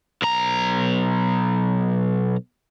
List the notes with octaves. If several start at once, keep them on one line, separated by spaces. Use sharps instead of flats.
B1 A#5